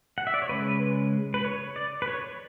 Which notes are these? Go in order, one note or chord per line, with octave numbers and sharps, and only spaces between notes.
F#5
E5
D5
C#5
C#3 G#3 C#4 B4
B4
C#5
D5
B4
C#5